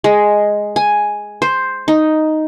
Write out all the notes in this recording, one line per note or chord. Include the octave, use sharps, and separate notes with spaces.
G#3
G#5
C5
D#4